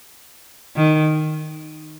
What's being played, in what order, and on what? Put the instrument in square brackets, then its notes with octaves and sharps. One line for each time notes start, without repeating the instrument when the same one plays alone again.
[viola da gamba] D#3